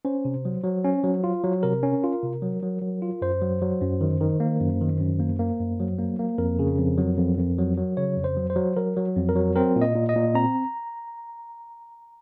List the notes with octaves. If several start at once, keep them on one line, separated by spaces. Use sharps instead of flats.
C#4 C5
C3
F#3
F#3
C#4
F#3
F4
F#3
C3 A#4
C#4
F4
C3
F#3
F#3
F#3
F4
F#2 C5
F#3
F#3
F#2
D#3
D#3
A#3
F#2
D#3
F#2
A#3
A#3
F#2
F#3
A#3
A#3
F2 A#4
C#3
F2
F#3
F2
F2
F#3
F#3
C#3 C#5
F2
C5
F#3
C5
F#3
F#3 A#4
F#3
F2
A#4
F#3
C4 A#4
A#2
D#5
A#2
D#5
A#2
C4 A#5